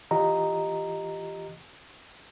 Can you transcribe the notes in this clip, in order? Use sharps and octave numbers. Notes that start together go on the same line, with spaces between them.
E3 F4 G4 D#5 A#5